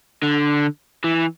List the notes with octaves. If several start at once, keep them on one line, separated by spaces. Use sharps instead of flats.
D3
E3